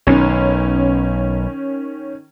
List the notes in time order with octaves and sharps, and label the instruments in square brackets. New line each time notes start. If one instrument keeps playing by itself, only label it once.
[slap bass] B1 [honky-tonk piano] D#3 C#4